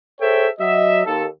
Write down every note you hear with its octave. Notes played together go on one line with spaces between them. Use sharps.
G#4 A4 C5 C#5 E5 G5
F#3 D#5 E5
D#2 A4